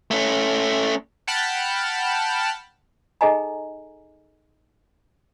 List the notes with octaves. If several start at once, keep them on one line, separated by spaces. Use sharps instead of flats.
A3 C#4
F#5 G5 A5 B5 F6 G6
D#4 G#4 A4 D#5 G#5 A#5